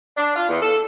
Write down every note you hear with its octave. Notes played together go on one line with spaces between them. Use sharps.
D4
F4
E2
A4